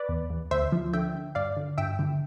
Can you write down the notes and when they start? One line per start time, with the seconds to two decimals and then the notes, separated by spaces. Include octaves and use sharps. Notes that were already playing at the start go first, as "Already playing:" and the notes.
Already playing: B4 D5
0.09 E2
0.30 E2
0.51 D2 C5 E5
0.72 F3
0.93 D3 E5 G5
1.15 D3
1.35 G2 D5 F5
1.57 D3
1.78 G2 E5 G5
1.99 D3